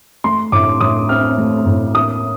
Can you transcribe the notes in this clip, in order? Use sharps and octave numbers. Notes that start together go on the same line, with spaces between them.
A3 C6
A2 D6
A2 D#6
C4 F6
A3
A2
A#3 D#6